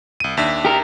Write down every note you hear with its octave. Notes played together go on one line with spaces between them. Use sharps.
C2 D#7
D#2 D4 E5
G4 A#4